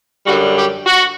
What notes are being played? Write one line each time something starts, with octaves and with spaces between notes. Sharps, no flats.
F#2 D3 G3 F#4
G4
F#4